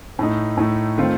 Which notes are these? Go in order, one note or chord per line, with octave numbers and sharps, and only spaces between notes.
A2 A3 D#4
A2 A3 D#4
D#3 A3 C4 F4 C5